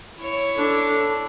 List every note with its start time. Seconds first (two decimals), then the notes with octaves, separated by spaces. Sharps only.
0.18 E4 C#5
0.56 D4 A4